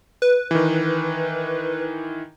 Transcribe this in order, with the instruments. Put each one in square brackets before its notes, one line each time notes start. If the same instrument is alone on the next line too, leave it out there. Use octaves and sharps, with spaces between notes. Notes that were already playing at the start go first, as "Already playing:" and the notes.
[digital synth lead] B4
[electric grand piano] D#3 E3